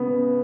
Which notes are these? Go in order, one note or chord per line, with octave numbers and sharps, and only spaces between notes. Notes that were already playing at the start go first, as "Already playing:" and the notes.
Already playing: C#3 B3